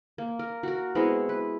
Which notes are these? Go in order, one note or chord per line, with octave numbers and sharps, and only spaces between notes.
A#3
A#4
F#4 A#4
G#3 B3 C4 E4
B4